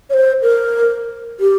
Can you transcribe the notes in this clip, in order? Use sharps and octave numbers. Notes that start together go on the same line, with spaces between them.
C#5
C5
A#4
G4